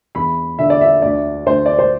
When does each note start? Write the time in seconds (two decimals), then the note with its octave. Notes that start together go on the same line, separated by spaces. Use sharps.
0.15 E2 B5
0.59 D3 E5
0.70 D5
0.81 E5
1.02 D2 D5
1.47 D2 C5
1.66 D5
1.79 C5